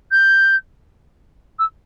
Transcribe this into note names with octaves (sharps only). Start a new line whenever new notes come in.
G6
E6